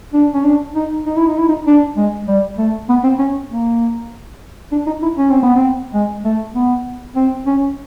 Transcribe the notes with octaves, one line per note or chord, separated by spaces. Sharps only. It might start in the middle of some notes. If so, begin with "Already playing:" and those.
D4
C#4
D4
D#4
D#4
E4
D#4
E4
D#4
D4
G#3
G3
A3
B3
C4
C#4
A#3
D4
D#4
E4
C#4
C4
B3
C4
G#3
A3
B3
C4
C#4